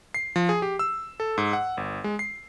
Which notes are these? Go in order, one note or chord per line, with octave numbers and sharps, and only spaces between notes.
C7
F3
G#4
G4
E6
A4
G#2
F#5
G1
G#3
C7